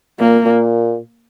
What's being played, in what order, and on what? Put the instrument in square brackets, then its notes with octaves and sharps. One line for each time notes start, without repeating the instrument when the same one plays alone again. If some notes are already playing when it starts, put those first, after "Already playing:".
[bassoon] A#2 [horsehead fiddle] A#3
[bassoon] A#2